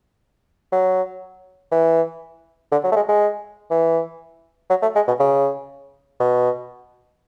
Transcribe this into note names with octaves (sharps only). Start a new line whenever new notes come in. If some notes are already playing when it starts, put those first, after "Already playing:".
F#3
E3
D3
F#3
A3
G#3
G#3
E3
F#3
A3
G#3
B2
C#3
B2